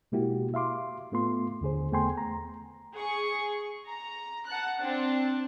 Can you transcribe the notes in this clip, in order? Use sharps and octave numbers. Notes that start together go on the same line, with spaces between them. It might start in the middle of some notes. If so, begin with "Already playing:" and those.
B2 G#3 A#3 E4 F#4 G4
E5 F5 C6 D6
A2 A3 B3 F4 C6
D#2 D3 G#4 C5
E2 A3 B3 G5 G#5 C6
A#5
G#4 C#6
A#5
F#5 A5 F#6
C4 D4 A5